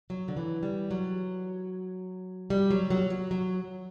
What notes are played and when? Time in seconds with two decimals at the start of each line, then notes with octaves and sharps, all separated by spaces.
0.10 F#3
0.28 D3
0.37 E3
0.63 G3
0.91 F#3
2.50 G3
2.71 F#3
2.90 F#3
3.10 F#3
3.31 F#3